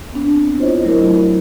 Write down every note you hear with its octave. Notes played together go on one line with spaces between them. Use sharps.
B3 C4 D4
E4 F4 C5 C#5 D#5
F#3 A3 E4 F#4 A#4